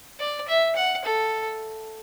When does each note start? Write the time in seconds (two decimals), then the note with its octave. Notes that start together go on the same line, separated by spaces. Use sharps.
0.20 D5
0.48 E5
0.76 F#5
1.05 A4